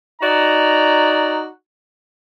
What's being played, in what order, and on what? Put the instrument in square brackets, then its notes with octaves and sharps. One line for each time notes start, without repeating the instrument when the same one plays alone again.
[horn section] D#4 F#4 D5 A#5